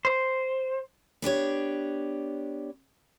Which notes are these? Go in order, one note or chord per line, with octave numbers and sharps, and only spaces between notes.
C5
B3 D4 G4 C#5